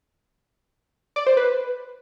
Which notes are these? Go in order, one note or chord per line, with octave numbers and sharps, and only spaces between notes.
D5
C5
B4